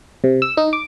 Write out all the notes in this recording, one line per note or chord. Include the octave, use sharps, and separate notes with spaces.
C3
E6
D#4
D6